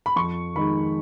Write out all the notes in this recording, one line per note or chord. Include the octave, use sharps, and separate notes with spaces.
B5
F2 C#6
D#3 G#3 D#4 B5